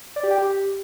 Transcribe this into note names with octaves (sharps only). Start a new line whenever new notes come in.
D5
G4
G5
G4